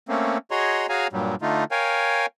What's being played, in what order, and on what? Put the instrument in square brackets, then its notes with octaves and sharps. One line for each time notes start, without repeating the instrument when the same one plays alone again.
[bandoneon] A3 A#3 C4 C#4
F#4 G#4 C#5 D#5 A#5 C6
F#4 G#4 C#5 F5 G#5 A#5
G2 A#2 F#3 G3
D3 A3 D#4 F4
A#4 C#5 F5 G5 G#5